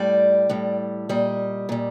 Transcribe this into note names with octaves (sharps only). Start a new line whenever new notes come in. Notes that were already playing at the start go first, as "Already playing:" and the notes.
Already playing: A2 G3 D5
A2 G3
A#2 G3 D#5
A#2 G3